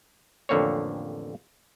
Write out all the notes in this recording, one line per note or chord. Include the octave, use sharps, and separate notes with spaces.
A1 F2 D3 A#3 C4 C#5